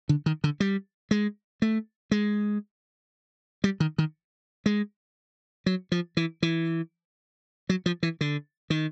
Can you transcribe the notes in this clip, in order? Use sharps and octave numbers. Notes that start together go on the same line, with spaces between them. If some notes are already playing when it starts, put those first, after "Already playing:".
D3
D#3
D3
G3
G#3
A3
G#3
G3
D#3
D#3
G#3
F#3
F3
E3
E3
F#3
F3
E3
D3
D#3